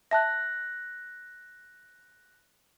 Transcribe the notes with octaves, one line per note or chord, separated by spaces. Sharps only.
E5 A5 F#6 A#6